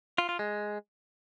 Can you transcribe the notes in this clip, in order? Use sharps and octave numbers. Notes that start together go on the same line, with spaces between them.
F4
F4
G#3